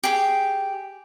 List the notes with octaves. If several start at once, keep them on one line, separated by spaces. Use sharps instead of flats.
G4 G#4